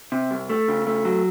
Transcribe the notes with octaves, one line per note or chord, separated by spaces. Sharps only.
C3
C2
A3
C#3
A3
F#3